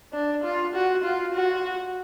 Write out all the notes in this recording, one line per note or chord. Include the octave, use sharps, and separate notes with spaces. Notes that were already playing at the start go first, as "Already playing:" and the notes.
D4
F4
F#4
F4
F#4